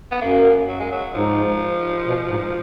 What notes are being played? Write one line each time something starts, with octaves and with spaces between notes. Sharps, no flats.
B3
F#2 A#3
F#3
G#3
F#3
G#2 F3
B2
G#2